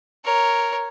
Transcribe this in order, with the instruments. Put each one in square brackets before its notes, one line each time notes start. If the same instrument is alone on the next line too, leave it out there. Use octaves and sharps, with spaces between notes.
[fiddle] A#4 C#5